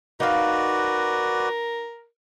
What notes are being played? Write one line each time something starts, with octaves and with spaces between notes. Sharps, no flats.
D#4 F#4 A#4 B4 D5 F5